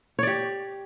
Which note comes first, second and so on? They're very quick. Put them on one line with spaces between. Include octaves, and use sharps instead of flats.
C#5 D5 G4